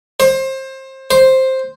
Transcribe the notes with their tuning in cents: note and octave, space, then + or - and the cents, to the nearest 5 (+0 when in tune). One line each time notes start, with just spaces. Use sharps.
C5 +25
C5 +5